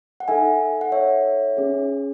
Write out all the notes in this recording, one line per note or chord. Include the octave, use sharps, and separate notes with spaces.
F#5
D#4 A4 E5 G#5
F#5
C#5 E5
C#4 G#4